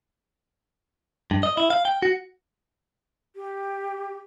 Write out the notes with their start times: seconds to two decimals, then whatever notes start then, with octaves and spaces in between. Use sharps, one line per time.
1.31 G2
1.43 D#5
1.57 E4
1.70 F5
1.85 G5
2.02 F#4
3.35 G4